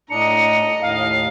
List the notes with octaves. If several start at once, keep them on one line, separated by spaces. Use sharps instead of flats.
A2 D4 D#5 A#5 C#7
D#2 A2 F5